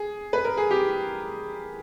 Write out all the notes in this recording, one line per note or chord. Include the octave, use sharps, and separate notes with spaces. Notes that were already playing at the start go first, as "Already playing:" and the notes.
Already playing: G#4
B4
A#4
G#4
G4